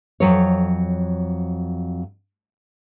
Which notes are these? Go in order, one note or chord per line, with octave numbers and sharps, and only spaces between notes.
F2 F#3 C#5